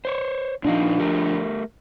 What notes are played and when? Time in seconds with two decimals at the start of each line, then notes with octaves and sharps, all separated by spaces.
0.05 C5 C#5
0.65 A#2 F3 D4 D#4 F5
0.99 A3 G4 A#4